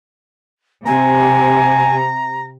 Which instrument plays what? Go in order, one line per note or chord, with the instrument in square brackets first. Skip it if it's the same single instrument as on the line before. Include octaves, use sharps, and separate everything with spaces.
[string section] C3 [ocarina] G#5 [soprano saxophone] A#5